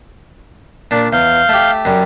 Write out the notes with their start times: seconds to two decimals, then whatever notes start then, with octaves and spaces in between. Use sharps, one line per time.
0.91 A#2 D4
1.13 E2 F5 G6
1.49 A3 G4
1.85 F#2 G3